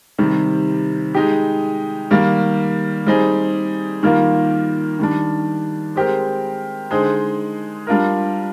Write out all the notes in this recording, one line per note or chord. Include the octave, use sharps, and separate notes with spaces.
C3 D#3 G3
G#3 D#4 G4
D#3 G3 A#3
G3 C4 D#4 G#4
D#3 G3 A#3 F4 A#4
D#3 G3 D4
G#3 C4 G4 A#4
D3 G#3 D#4 G#4 C5
G3 D4 F4 A#4